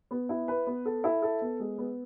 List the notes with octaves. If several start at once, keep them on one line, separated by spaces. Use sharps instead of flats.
B3
E4
B4
B3
A4
E4
A4
B3
G#3
B3